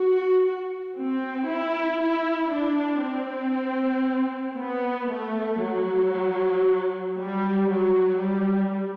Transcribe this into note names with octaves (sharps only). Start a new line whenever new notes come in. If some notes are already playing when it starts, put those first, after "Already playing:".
Already playing: F#4
C4
E4
E4
D4
C4
B3
A3
F#3
G3
F#3
G3